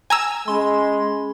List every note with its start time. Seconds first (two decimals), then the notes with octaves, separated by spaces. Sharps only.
0.10 G#5 A#5 E6
0.48 G#3 C#4 G#4 B5 C6